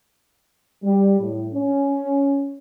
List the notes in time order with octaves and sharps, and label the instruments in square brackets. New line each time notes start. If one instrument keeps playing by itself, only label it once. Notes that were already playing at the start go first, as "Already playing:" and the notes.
[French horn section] G3
A2
C#4